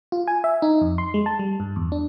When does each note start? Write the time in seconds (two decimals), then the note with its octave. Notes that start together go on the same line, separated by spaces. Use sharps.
0.12 F4
0.28 G#5
0.44 E5
0.62 D#4
0.81 F2
0.98 C6
1.14 G#3
1.26 A5
1.39 G3
1.60 G2
1.76 E2
1.92 D4